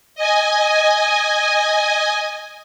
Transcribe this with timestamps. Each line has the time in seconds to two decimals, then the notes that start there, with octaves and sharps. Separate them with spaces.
0.15 D#5 G#5